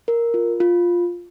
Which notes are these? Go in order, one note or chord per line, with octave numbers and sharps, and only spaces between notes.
A#4
F4
F4